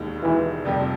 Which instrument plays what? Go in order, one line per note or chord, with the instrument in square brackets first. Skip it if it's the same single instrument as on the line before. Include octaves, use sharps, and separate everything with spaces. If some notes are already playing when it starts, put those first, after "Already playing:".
Already playing: [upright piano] E1 D#2 D#3
[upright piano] E1 D#2 D#3 [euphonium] E3
[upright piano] F1 F2 C3 F3 A#3 [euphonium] G3